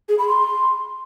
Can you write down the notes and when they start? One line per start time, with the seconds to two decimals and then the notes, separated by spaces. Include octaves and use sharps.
0.09 G#4
0.18 B5
0.28 C6